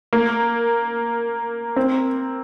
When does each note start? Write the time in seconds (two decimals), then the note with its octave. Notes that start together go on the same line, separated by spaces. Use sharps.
0.13 A#3
1.76 C4